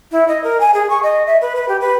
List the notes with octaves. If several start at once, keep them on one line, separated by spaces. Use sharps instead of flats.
E4
D#5
A#4
G#5
G#4
C#6
D#5
E5
B4
B4
G4
B4